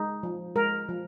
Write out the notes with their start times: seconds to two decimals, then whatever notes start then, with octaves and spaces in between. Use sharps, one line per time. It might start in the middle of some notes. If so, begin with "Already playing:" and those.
Already playing: G#3 D#4
0.23 F3
0.56 G#3 A#4
0.89 F3